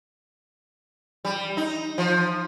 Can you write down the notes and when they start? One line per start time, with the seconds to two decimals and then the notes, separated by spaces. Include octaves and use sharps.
1.25 G3
1.57 D#4
1.98 F3